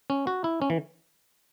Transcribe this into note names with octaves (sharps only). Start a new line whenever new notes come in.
C#4
F#4
E4
C#4
E3